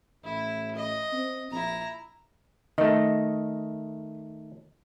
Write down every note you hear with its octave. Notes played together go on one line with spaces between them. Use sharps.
A1 E4
D#5
C4
A#1 E4 A#5
D#3 A3 D#5